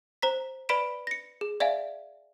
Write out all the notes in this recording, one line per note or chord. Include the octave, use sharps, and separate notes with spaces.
C5 A#5 B6
B4 D5 B5 B6 D7 E7
A#6 C#7
G#4
D5 E5 F5 G#5